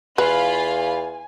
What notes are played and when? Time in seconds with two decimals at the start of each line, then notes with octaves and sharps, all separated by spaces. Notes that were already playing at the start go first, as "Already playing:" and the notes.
0.18 E2 F4 B4 F5 G#5 B5